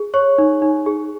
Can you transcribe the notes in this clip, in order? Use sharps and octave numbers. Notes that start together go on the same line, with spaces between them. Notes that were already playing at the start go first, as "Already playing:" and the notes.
Already playing: G#4
C#5 C#6
D#4
D#4
G#4